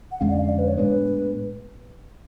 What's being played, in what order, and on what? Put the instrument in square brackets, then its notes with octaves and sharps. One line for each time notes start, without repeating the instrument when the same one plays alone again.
[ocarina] F#5
[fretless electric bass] F2 D3 G#3 C#4 [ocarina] F5
[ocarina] D5
F5
D5
B4
C#5
[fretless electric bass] A2 G#3 B3 D4 [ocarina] B4